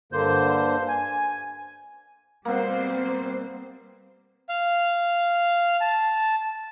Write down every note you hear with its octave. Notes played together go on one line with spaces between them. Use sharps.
G2 D3 A#3 C5 G6
G#5
B2 G3 A#3 C4 C5
F5
A5